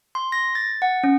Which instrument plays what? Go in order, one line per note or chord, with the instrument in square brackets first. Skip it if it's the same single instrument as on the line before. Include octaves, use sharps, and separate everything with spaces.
[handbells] C6
A#6
A6
F#5
C#4